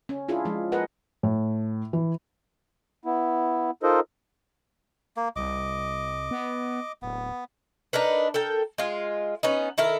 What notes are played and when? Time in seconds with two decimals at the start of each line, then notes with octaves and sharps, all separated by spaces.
0.09 C#4
0.28 D4 E4 F4 G#4
0.45 F3 G#3
0.72 G#4 A#4 B4 D#5 F#5
1.23 A2
1.93 E3
3.05 B3 E4
3.83 D#4 F4 A4 A#4 C5 D#5
5.16 A#3
5.36 C2 D#5 D6
6.31 B3
7.02 D1 B3
7.93 D4 D#4 A#4 B4
8.34 A4 A#4 G5
8.78 G#3 F4
9.43 B3 C#4 D#4
9.78 D#3 E4 A4 A#4